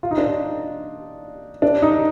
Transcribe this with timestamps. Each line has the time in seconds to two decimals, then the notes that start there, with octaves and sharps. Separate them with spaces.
0.03 F4
0.11 D#4
0.18 D4
0.24 D#4
1.62 D4
1.82 D#4